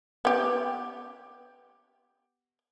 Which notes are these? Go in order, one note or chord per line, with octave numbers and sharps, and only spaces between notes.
B3 G4